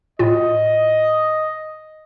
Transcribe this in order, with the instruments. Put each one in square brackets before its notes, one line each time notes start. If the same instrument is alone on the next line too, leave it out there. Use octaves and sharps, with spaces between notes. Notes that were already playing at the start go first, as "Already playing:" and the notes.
[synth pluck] A2 F4 [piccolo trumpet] D#5